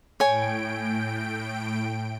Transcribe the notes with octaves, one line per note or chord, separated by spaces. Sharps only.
A2 C#5 G5 G#5 D7